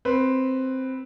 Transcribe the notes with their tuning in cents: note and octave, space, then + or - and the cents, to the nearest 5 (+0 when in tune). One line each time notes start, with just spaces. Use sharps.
C4 +0 B4 +5